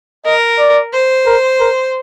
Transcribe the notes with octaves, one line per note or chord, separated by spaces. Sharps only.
A#4 D#5
D5
C5
A#4
A#4